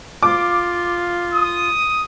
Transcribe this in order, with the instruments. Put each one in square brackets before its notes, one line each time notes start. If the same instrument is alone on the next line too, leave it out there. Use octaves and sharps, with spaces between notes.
[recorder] F4 [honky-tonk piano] D6
[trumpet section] D#6